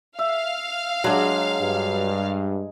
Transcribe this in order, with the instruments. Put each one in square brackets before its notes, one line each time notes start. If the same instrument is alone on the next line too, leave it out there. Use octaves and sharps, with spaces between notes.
[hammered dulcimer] E5 [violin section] F5
[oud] F#3 D4 [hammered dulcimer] G#3 A#5
[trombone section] G2